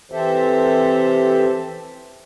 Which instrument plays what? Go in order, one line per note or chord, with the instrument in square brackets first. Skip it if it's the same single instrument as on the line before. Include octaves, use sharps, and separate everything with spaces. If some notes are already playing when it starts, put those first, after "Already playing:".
[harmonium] E3 C4 G4 A4 C5 E5